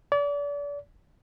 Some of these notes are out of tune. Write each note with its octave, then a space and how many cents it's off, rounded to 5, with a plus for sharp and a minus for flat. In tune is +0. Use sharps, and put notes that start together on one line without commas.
D5 -35